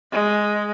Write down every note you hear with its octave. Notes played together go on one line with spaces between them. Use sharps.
G#3